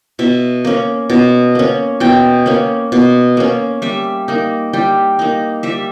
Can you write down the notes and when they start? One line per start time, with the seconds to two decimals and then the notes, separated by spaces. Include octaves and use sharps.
0.19 B2 E5
0.65 A#3 C#4
1.10 B2
1.55 A#3 C#4
2.00 B2 G5
2.46 A#3 C#4
2.92 B2
3.37 A#3 C#4
3.82 G3 E5
4.28 A#3 D#4
4.73 G3 G5
5.19 A#3 D#4
5.63 G3 E5